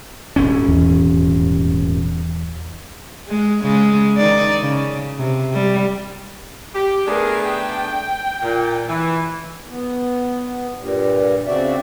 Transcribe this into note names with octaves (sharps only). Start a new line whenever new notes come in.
D#1 G#1 C#4
E2
G#3
C#3 G#3
D#3 D#4 D5
C#3
C3
G3
G4
A3 B3 D4 G#4 A#4
G5
A#2
E3
B3
G2 A#2 G3
C#3 C4 D4 F#4 D5 E5